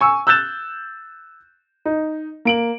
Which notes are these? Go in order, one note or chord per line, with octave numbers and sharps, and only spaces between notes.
G#5 C#6 E6
E6 F#6 G6 A6 E7
D#4
A#3 D7 F#7